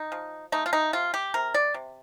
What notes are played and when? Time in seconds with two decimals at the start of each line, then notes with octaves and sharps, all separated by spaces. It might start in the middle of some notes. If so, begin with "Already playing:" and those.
Already playing: D#4
0.12 F3
0.52 A3 D#4
0.66 F4
0.73 D#4
0.93 C3 F4
1.14 G4
1.34 C3 A#4
1.54 D5
1.74 C3